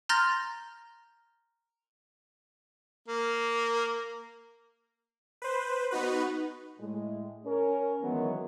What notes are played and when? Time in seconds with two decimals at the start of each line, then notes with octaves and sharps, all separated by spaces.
0.09 A#5 C6 F6 G6 A6 A#6
3.08 A#3
5.42 B4 C5
5.91 B3 D#4 F#4 B4
6.80 A2 G#3
7.46 C#4 A#4
8.02 D#3 E3 F#3 G#3 B3